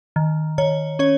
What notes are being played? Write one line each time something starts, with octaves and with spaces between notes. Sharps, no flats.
D#3
D#3 C#5
C#4 C#5